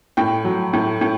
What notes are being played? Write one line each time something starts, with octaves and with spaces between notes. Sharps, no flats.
A2 G5
F#3
A2
A2